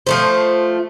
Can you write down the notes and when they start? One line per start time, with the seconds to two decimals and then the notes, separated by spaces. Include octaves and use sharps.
0.07 F3 A3 C5